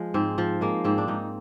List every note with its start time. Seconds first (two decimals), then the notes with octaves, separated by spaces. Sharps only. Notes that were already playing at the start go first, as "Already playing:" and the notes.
Already playing: F3 G#3
0.14 G#2 C4
0.38 F3
0.61 G#3 A#3
0.84 G#2 C4
0.98 D4
1.08 G#2 D#4